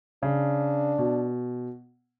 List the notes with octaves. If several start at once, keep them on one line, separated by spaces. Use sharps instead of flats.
C#3 D4
B2